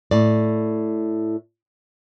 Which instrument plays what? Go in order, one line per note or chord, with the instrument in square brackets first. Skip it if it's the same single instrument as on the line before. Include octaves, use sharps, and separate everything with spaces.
[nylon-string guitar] A2 D5